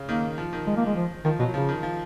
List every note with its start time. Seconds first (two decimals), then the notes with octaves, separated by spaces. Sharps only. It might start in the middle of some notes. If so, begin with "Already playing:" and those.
Already playing: C#3
0.08 D#3 A#3
0.38 F3
0.53 D#3
0.67 G#3
0.77 A#3
0.86 G#3
0.96 F3
1.25 D#3 F3
1.39 B2 F#3
1.54 C#3 F3
1.69 D#3
1.83 F3